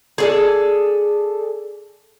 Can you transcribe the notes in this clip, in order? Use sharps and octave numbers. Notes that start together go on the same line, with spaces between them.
G#4 A4 D5